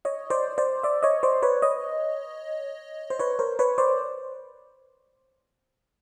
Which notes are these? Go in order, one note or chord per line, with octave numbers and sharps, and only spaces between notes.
C#5 D#5
C5 D5
C5 D5
D5 E5
C#5 D#5
C5 D5
B4 C#5
C#5 D#5
C5
B4 C#5
A#4 C5
B4 C#5
C5 D5